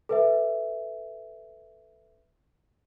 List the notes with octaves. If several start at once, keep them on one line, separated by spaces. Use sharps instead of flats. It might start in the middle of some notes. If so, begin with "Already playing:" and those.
A4 B4 E5